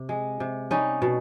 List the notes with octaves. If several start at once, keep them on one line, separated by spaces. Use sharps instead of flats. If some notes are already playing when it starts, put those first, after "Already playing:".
Already playing: C3
G#3
C3
G3 C#4 D#4
B2